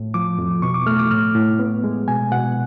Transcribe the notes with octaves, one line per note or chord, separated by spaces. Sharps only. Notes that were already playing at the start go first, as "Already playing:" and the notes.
Already playing: A2
F3 D6
F2
B2 C#6
D6
A3 F6
D6
A2 F6
A2
B3
G#3
B2 G#5
B2 F#5